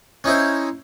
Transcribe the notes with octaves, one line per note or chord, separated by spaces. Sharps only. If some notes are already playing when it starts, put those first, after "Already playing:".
C#4 D#4 E4 C5